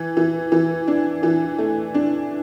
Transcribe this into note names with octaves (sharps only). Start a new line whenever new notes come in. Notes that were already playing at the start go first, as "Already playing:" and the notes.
Already playing: E3
E3
E3
D4
E3
A3
D4